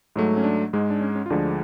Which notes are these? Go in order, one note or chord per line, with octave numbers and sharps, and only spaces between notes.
G#2 F#3 A3
C#4
D4
G#2 G#3
D4
C#4
C#4
F4
D2 D3 F3 G#3 D4